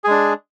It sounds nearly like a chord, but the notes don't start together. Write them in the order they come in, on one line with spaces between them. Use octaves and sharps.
G#4 G#3 D4